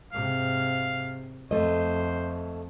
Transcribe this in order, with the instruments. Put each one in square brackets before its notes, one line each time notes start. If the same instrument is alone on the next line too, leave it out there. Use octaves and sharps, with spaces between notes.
[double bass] G#2 C3 [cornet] F5
[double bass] F2 [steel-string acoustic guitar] A3 D#5 [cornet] C5